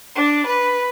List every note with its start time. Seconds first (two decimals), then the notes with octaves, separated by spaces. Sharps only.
0.16 D4
0.47 B4